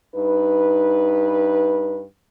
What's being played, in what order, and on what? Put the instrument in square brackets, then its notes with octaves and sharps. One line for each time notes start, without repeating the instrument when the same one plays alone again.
[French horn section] G2 D#4 B4